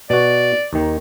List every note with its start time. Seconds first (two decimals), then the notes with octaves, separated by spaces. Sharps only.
0.10 B2 F#4 D5
0.73 D#2 D#3